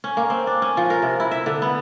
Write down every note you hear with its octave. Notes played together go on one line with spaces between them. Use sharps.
C#4
A#3
C4
D4
C#4
F3
A#4
C3
E4
E5
D3
B3